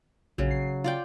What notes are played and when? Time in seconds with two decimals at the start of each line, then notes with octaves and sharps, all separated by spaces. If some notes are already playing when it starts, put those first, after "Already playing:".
0.38 A#1 C#3 F#3
0.51 C7
0.84 F4 D5 F5 G5